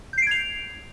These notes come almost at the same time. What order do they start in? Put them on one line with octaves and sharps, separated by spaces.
G6 C7 D7 G#6 F7